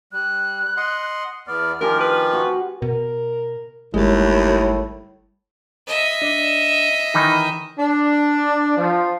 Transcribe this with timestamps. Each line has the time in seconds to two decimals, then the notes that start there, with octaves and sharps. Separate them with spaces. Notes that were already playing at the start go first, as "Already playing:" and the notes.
0.13 G3 F#6
0.77 D#5 F#5 C6
1.47 E2 B3 D5 F6
1.81 D#3 F3 F4 G4 A#4 G5 G#5
2.00 B4
2.33 F#4
2.82 B2 A#4
3.94 G1 D#2 A2 G3 G#3 C#5
5.87 D#5 E5
6.22 D4
7.14 D#3 E3 D#4
7.78 D4
8.77 F3